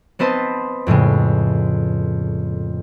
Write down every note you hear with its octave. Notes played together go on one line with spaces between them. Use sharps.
B3 C4 B4 C5 D#5 A5
F2 A2 C#3 G#3